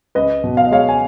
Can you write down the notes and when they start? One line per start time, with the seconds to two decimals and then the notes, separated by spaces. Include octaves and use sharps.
0.15 C#2 B4 D#5
0.44 B2
0.57 F5
0.65 D#5
0.71 G#3 C#5 F5
0.89 G#5